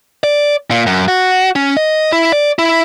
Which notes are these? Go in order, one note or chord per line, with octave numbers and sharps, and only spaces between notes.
D5
A#2
F#2
F#4
C#4
D#5
E4
D5
E4